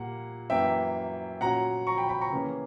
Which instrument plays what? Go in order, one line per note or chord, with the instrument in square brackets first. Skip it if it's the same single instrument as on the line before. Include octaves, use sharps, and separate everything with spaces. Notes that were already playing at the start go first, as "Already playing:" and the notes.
Already playing: [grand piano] A#2 G3 A#3 F#5
F#2 E3 A#3 E5 G5
A#2 F#3 C#4 F#5 A#5
A#5 C#6
G5 B5
G5 B5
A#5 C#6
C#3 E3 A#3 C#4